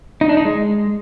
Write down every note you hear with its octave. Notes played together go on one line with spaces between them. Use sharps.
D#4
D4
D#4
G#3